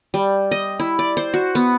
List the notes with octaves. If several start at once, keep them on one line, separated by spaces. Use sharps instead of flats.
G3
D#5
E4
D5
C5
F#4
B3